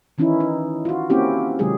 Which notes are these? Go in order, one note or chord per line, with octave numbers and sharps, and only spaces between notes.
D#3 E3 C#4 D#4 E4
D#4
F4 F#4
A#3 C4 C#4 E4 F#4 G4
C3 D#3 F#3 G#3 G4 G#4